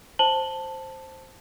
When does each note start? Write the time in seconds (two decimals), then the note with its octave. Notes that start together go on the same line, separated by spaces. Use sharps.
0.19 C5 A5 F#7 G7